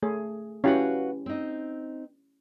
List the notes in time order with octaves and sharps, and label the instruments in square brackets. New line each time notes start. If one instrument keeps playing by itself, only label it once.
[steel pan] A3 G#4
[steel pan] C#4 E4 G4 [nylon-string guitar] F#4 B4 F5
[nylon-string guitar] C4 D#4